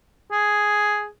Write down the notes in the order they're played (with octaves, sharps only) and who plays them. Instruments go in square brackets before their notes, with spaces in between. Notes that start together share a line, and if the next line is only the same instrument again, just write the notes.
[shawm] G#4